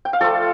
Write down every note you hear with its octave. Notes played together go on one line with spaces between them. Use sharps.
G5
F5
F3 A3 F4 A4 D5